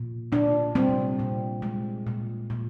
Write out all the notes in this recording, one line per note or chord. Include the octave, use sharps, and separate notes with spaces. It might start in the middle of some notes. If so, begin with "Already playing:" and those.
Already playing: A#2
A#2 D4
G3 C4
A#2
G#3
A#2
A#2